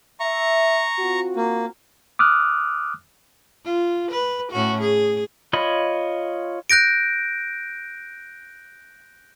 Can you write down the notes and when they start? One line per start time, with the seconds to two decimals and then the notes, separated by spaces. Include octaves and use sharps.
0.20 E5 A#5 C#6
0.99 C4 F4 F#4
1.36 A#3
2.19 D6 D#6 F6 F#6
3.65 F4
4.11 B4
4.52 A2 C#4 F#4
4.81 G#4
5.53 F4 C#5 D#5 B5
6.70 F#6 G6 A#6 D7